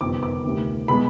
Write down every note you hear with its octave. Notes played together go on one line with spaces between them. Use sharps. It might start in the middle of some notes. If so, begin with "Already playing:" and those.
G1 F2 C3 D#3 D6
D6
D2 C3 D#3
B2 G#3 B5